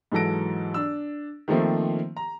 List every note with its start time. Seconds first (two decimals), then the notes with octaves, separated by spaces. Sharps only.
0.12 G#2 E3 F#3 A4 A#6 D7
0.74 D4 E6
1.48 D#3 F3 A3 A#3 C4
2.17 A#5